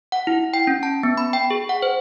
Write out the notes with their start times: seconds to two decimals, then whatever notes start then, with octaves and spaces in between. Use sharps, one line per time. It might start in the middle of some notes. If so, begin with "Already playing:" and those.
0.12 F#5
0.27 E4
0.54 G5
0.67 C#4
0.83 A5
1.03 B3
1.17 B5
1.33 G5
1.51 G#4
1.69 F#5
1.82 C5